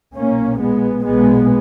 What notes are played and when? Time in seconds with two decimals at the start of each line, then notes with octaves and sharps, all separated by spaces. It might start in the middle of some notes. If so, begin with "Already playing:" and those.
0.15 B1 A#2 A#3 C#4
0.60 G#3 B3
1.06 B1 A#2 G#3 B3